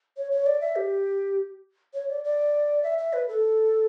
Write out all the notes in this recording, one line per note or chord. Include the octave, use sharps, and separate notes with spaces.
C#5
C#5
D5
E5
G4
C#5
D5
D5
E5
E5
B4
A4